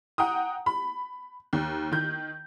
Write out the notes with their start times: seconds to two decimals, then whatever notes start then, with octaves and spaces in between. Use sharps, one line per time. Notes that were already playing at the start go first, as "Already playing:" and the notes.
0.18 F#5 G5 A#5 D#6
0.66 B5
1.53 D#2
1.92 D#3 G6